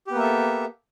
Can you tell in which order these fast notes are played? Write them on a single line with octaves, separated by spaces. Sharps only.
G4 B3 A#3 E5 A4